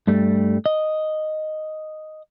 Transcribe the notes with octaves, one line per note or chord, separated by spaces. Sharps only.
G2 G3 A3
D#5